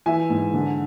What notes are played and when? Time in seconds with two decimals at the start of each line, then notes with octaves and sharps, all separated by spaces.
0.06 E3 E5 G#5
0.30 G#2
0.53 D3